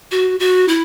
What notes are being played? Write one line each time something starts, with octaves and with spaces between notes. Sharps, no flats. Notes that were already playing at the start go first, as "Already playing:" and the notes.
F#4
F#4
E4